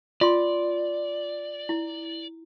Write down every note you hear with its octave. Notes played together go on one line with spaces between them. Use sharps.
F4 D5 C6
E4